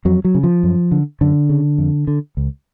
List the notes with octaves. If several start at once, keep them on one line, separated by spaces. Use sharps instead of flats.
F2 F#3
F#3
C#3
F3
F#2
D3
F#2 D3
C#3
F2
D3
C#2